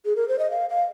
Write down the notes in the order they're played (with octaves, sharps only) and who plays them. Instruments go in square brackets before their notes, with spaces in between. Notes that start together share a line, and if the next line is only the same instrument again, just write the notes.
[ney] G#4
A#4
C5
D#5
F5
F5